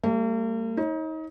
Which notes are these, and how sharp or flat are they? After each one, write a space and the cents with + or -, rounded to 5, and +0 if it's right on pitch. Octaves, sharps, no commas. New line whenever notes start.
G3 +15 A#3 -45
D#4 +30 C#5 -25